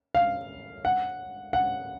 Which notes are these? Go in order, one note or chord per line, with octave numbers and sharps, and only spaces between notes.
F5
F#5
F#5